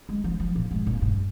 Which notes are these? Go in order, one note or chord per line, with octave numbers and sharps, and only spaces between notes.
G#3
F3
F3
A#2
G#2
A#2
G2